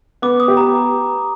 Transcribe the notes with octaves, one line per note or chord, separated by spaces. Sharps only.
B3 D6
D#6
G4
A#5